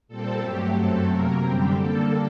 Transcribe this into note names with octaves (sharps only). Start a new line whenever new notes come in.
A#2 G3 C4 A4
G2 F#3 A3 C4 G4
F#2 F#3 A3 C4 A4
C3 F#3 A#3 A#4
F#2 D3 G3 C4 G4
D3 G3 A#3 A4